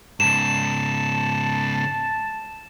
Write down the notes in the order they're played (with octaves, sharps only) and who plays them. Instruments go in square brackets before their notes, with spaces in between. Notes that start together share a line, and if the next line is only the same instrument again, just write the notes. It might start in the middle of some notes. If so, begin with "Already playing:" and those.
[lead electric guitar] G#2 C#3 [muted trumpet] A5 [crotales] E7